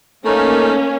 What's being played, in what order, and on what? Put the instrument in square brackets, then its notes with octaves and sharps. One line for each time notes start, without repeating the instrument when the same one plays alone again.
[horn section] A3 D#4 A#4 [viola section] A#3 C#4